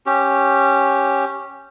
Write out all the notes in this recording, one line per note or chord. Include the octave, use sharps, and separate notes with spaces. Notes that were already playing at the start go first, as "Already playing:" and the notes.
C#4 G4